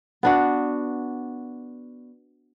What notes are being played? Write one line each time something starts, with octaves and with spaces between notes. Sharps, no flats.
B3 D4 F#4